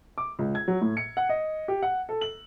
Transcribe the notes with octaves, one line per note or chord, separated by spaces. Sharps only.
D6
C#2
G#6
F#3
A2
C#7
F#5
D#5
G4
F#5
A4
F#7